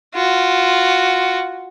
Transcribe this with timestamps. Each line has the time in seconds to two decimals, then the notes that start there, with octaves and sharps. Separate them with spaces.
0.15 F4 F#4